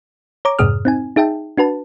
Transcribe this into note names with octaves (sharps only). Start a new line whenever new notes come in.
C#5 A#5 D6
F2 G#2 C3 G#4 D#6 F6
C4 D#4 G#5
D#4 G#4 E5 G5 A5
D4 F#4 B4 A5